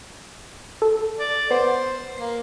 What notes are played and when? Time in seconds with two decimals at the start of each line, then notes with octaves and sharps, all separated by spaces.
0.82 A4
1.19 D5
1.51 B3 C5
2.18 A#3 C7